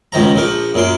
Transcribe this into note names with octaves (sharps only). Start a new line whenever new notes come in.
C#2 G#2 D#3 F3 A#5
A#1 F3 A#4 C#6
F#2 A#2 A#4 C6